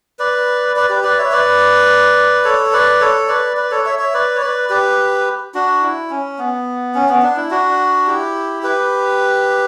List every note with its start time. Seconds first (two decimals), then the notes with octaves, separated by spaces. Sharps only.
0.19 B4 D5
0.76 B4 D5
0.89 G4 B4
1.04 B4 D5
1.18 C#5 E5
1.32 B4 D5
2.44 A4 C#5
2.73 B4 D5
3.00 A4 C#5
3.28 B4 D5
3.57 B4 D5
3.71 A4 C#5
3.85 C#5 E5
3.99 C#5 E5
4.14 B4 D5
4.35 C#5
4.41 B4 D5
4.70 G4 B4
5.55 D4 F#4
5.82 E4
6.10 C#4
6.39 B3
6.95 C#4
7.09 B3
7.22 D4
7.37 E4
7.51 D4 F#4
8.07 E4 G4
8.63 G4 B4